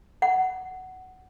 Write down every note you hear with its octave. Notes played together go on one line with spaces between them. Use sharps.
F#5